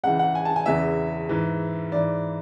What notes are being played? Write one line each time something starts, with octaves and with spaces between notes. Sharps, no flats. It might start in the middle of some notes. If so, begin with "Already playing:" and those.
C#2 C#3 E3 F#5
F#5
G#5
A5
G#5
E2 C#3 E3 E5
G#2 E3
G#2 E3 D5